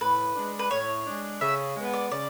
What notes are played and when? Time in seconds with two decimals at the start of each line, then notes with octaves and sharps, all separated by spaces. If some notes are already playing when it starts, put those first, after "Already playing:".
0.01 A2 B4
0.36 G#3 D4
0.59 B4
0.71 A2 C#5
1.06 G#3 D4
1.41 C#3 E5
1.76 G#3 B3
1.93 D5
2.11 C#3 D5